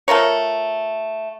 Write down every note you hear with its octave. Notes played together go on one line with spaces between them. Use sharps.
A3 F4 A#4 C#5